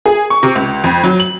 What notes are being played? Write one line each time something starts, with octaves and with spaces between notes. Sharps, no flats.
G#4
C#6
C3
C#2
F2
F#3
F#7